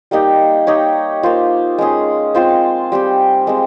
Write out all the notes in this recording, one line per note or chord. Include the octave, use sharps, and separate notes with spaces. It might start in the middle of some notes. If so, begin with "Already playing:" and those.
G3 A#3 D#4 G4
D#4 G4 C#5
A#3 F4 C5
G#3 C#4 G#4
C4 F4 C5
G3 C4 G4
G#3 C4